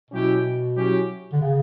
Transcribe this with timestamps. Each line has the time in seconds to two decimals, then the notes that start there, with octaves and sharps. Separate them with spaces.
0.11 B2 F#3 C#4 E4 G4
0.75 F#3 C#4 E4 G4
1.33 D3
1.41 C#3